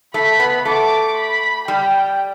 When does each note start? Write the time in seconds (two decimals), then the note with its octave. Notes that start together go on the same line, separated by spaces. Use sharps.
0.14 A3 B5
0.40 B3
0.65 A3 D6
1.17 B5
1.68 G3 G5